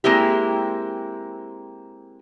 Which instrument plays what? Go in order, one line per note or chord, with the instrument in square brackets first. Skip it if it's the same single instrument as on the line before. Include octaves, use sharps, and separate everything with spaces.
[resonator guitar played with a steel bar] G#3 A#3 C4 E4 G4